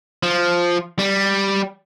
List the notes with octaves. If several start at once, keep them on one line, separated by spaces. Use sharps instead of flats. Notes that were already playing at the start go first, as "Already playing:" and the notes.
F3
G3